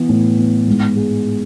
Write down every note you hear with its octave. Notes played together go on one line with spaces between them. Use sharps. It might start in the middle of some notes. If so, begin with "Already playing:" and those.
Already playing: E3 B3
A2
B3
G#2
G#3